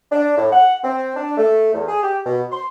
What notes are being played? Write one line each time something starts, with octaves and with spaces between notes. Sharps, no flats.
D4
A2
F#5
C4
D4
A3
E2
G#4
G4
B2
C6